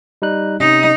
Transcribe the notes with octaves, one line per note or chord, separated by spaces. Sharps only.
G3 D#4 F#6
C3 C#4 D#4 D#5